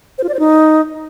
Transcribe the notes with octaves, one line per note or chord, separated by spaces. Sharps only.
C5
F4
D5
C5
D#4